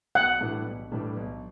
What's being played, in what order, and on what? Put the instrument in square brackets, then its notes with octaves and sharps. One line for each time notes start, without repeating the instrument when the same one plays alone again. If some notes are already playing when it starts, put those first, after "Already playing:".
[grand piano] B1 [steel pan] F#5
[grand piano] A2 E3 G3 D4
B1
A2 E3 G3 D4
B1